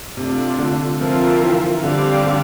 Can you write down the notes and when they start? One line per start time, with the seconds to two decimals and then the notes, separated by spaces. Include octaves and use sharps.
0.17 C3 A3 D4 F4
0.59 D3
1.00 F3 C4 F4 A#4 E5
1.42 E3
1.84 D3 G3 C4 G4 D5 F5
2.26 D3